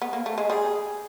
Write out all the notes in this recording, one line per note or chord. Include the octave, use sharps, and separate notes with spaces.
B3
A#3
A3
G#3
G3 G#4